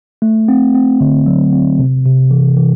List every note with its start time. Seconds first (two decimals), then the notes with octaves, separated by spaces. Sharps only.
0.22 A3
0.48 C4
0.75 C4
1.01 D3
1.26 F#3
1.52 C4
1.79 C3
2.05 C3
2.31 E3
2.57 E3